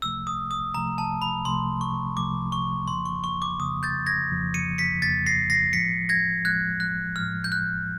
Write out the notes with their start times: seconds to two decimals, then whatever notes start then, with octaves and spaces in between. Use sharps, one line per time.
0.02 C2 C3 F3 A3 E6
0.27 D#6
0.51 D#6
0.74 C2 C3 F3 A3 A#5
0.98 A5
1.22 B5
1.45 C2 C3 F3 A3 C6
1.81 C#6
2.17 C2 C3 F3 A3 D6
2.52 C#6
2.87 F2 C#3 F3 A#3 C6
3.06 C#6
3.24 C#6
3.42 D6
3.59 F2 C#3 F3 A#3 D#6
3.83 G6 A6
4.06 G#6 A#6
4.31 F2 C#3 F3 A#3
4.54 C#7 D#7
4.78 B6 C#7
5.02 F2 C#3 F3 A#3 A6 B6
5.26 A#6 C7
5.50 A#6 C7
5.73 A2 F3 G#3 B6 C#7
6.09 G#6 A#6
6.45 A2 F3 G#3 F#6 G#6
6.80 F#6
7.16 A2 F3 G#3 F6
7.44 G6
7.52 F#6